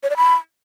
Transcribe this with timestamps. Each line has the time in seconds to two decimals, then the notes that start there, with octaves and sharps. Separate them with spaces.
0.03 C#5
0.10 D5
0.17 B5